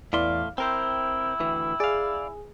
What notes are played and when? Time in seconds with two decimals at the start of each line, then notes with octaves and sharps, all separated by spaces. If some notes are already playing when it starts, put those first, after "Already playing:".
0.13 E2 A2 E3 D5 E5 F5 C6
0.58 C4 E4 A#4 C5 G5
1.40 D2 E3
1.80 G#4 D5 F5